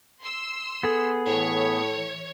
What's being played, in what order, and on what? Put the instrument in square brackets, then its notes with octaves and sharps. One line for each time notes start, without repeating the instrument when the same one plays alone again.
[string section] C6 E6
[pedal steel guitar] B3 G#4 [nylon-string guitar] A4
[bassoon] A2 [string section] E3 C#5